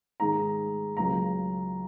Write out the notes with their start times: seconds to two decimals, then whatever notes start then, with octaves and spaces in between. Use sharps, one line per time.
0.20 G#2 D#3 G#3 A#5
0.97 C#2 C#3 F#3 A#5